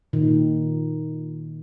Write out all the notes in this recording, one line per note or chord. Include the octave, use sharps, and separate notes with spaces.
A#2 D#3